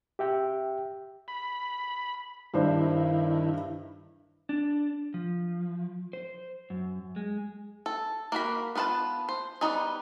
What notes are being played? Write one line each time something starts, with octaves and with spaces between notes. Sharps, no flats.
G4 E5 G5
B5
G2 D#3 D4 E4 C5
D4
F3
C5
F#2
G#3
A4
A#3 F#4 A#4 B5
B3 F4 B4 F5 A5
C5
G3 B3 D#4 G#4